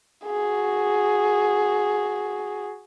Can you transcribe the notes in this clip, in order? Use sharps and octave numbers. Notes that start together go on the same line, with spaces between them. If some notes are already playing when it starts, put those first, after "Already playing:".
F#4 G#4